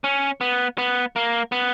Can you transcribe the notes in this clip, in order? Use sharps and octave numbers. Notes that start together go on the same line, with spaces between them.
C#4
B3
B3
A#3
B3